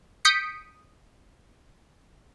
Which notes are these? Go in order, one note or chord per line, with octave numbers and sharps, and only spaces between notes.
D#6 G6 B6 C#7 D7